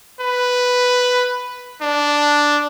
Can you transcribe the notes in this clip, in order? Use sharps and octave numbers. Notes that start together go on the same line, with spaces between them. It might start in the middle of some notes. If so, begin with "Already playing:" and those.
B4
D4